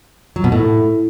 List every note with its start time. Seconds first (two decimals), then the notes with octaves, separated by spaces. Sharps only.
0.36 F#3
0.44 B2
0.52 A2